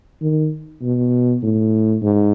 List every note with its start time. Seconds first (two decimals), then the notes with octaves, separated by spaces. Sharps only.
0.22 D#3
0.82 B2
1.43 A2
2.02 G#2